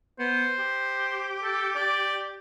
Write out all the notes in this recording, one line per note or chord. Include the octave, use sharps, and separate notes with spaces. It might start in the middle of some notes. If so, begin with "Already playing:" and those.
B3 C5
G4
A4
D5